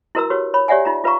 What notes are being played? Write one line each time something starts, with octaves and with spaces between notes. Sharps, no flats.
E4 F#4 A#4 B4 A#5 E6
F#4 G4 B4 C#5
C#5 B5
G4 C#5 D5 E5 F#5 G#5
D#4 F4 A#5
F4 B4 F5 A#5 C#6